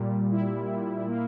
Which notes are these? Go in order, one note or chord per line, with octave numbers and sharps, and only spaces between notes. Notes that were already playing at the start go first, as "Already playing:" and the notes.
Already playing: A#2 G3
E4
A#2
A#3